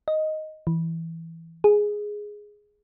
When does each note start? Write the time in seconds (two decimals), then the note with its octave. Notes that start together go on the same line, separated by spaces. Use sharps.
0.08 D#5
0.67 E3
1.64 G#4